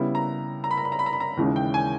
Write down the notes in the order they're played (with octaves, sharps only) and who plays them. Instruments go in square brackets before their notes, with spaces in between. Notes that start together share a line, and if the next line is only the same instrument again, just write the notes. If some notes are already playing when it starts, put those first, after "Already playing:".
Already playing: [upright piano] C#3 G3 B3 E4
[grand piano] A#5
A#5
B5
A#5
B5
A#5
B5
A#5
B5
A#5
[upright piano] D#2 C#3 E3 G#3 C#4
[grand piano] G5
G#5